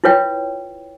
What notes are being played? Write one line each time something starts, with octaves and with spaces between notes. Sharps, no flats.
E4 F4 B4 C#5 G5